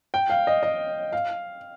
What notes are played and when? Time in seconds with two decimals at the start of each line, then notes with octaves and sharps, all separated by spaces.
0.14 G5
0.30 F5
0.47 D#5
0.63 D#5
1.13 F5